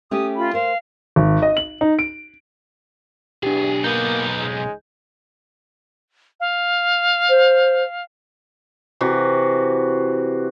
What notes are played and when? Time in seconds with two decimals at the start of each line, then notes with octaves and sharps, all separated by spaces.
0.11 A3 C#4 G4 D#6
0.37 F4 B5
0.54 A#4 C5 F5
1.16 G#1
1.42 D#5
1.57 F#7
1.81 D#4
1.99 D7
3.43 B1 E2 E3 D4 G4 G#4
3.84 A#3 B3 D#4 G6
4.38 G#2 C#3 G#3
6.40 F5
7.29 C5
9.01 C3 E3 F#4